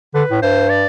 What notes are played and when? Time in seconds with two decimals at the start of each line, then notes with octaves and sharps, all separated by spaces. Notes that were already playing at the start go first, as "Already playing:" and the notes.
0.15 D3 B4
0.31 A2
0.42 G2 C5
0.69 D5